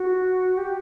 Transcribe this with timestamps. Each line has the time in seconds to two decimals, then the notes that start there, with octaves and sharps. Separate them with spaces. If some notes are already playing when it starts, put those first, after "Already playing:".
Already playing: F#4
0.58 G4